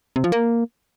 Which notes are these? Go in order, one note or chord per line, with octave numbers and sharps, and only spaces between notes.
C3
F3
A#3